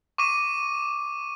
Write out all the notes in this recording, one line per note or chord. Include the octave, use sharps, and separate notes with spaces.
C#6 D6 D#7